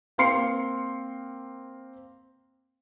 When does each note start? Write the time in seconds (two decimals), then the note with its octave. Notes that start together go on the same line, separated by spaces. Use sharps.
0.18 A#3 C4 F5 C6 C7 C#7